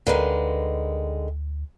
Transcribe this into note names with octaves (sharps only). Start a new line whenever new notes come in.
D2 D3 D#3 G#3 A#4 B4 F5